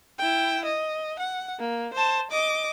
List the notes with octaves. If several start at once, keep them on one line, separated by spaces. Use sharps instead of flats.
E4 G5
D#5
F#5
A#3
C5 A5
D#5 D6